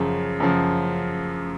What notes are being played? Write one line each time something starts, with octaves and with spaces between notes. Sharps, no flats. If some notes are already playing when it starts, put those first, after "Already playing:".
Already playing: F#2 C#3 F3
F#2 C#3 F3